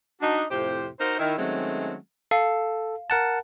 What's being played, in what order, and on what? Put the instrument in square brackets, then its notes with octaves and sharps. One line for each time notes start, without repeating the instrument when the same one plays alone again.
[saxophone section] D4 D#4 F#4
F2 A2 C3 G4 C5
D#4 F#4 A#4 C5
D#3 E4
D#3 F#3 G#3 A3 C4 C#4
[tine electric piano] A4 [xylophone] F5
[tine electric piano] A#4 F#5 A5